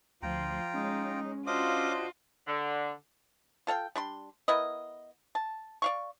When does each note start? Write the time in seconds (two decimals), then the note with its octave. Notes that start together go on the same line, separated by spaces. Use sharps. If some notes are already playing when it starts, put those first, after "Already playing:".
0.22 D2 F3 F4 G5 A#5
0.74 G#3 C#4 D#4
1.47 D4 F4 F#4 C5 D#5 F5 D6 D#6
2.47 D3
3.67 F4 A4 F5 G5
3.96 G3 D4 C6
4.48 B3 E4 A#4 D#5
5.35 A5
5.82 D5 F5 C#6